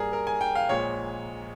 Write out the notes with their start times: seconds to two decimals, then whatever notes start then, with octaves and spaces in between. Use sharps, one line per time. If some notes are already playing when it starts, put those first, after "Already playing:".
Already playing: G2 G3 A#3 G#4 A#4
0.13 A#4
0.27 G#5
0.41 G5
0.55 F5
0.69 A#1 A#2 G#3 C#5